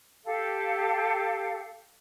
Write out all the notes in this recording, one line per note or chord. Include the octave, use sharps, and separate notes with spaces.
G4 A4 F5